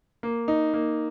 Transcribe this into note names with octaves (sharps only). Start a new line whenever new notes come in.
A#3
D#4
A#3